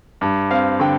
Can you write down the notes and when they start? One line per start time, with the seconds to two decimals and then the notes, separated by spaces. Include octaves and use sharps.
0.21 G2
0.51 C4 F5
0.80 D3 G5